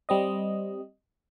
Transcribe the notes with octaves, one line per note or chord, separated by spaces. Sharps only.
G3 C4 D#5